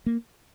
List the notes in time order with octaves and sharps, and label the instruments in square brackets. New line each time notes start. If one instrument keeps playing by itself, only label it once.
[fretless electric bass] A#3